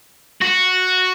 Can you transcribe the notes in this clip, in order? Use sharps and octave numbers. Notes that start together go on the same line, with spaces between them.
F#4